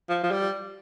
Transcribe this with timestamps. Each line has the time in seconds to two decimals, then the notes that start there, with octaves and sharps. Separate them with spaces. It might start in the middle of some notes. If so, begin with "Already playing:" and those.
0.09 F3
0.23 F3
0.31 G3